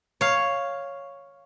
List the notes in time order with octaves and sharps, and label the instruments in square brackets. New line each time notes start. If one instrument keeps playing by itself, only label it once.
[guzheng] C#5 F5